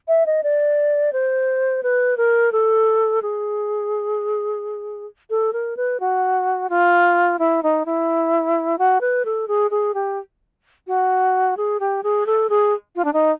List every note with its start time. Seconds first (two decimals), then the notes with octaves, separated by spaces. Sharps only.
0.08 E5
0.26 D#5
0.43 D5
1.13 C5
1.83 B4
2.17 A#4
2.52 A4
3.22 G#4
5.30 A4
5.53 A#4
5.77 B4
6.00 F#4
6.70 F4
7.39 E4
7.63 D#4
7.86 E4
8.79 F#4
9.01 B4
9.25 A4
9.48 G#4
9.71 G#4
9.94 G4
10.87 F#4
11.57 G#4
11.80 G4
12.03 G#4
12.26 A4
12.50 G#4
12.96 F4
13.05 D4
13.13 D#4